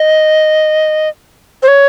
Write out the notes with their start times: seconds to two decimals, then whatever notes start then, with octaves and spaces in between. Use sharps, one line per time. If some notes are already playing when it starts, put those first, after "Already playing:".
Already playing: D#5
1.63 C5
1.68 C#5